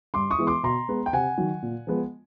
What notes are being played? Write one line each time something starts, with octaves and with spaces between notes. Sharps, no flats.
G2 C6 D6
C#6 D#6
E3 G#3 B3
C6 D6
B2 A#5 C6
G#3 B3
G5
C3 F#5 G#5
D#3 F#3
A#2
F3 G#3 B3